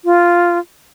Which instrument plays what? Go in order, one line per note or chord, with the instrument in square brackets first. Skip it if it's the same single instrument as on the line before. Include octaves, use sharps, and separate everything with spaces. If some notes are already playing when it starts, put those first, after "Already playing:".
[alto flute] F4